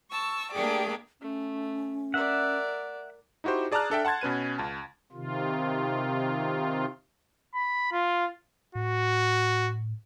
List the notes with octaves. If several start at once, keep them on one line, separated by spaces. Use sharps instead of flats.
A5 C#6 E6
A3 A#3 D4 G4 G#4 D5
A3 C#4
A#4 D5 E5 F#5
D#4 E4 F#4 G4 C5
G#4 D5 A5 A#5 F6 F#6
D4 A4 E5 G5
F#5 A5 C6 G#6 A6
B2 C#4 B4 D#7
C#2 A5
C3 D#3 F4
B5
F4
A2 F#4